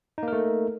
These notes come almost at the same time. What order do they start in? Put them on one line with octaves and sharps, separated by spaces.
D#4 A#3 A#4 A3